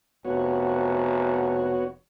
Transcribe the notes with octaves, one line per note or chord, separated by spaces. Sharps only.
F1 B3 F#4 C#5